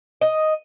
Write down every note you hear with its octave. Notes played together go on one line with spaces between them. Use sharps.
D#5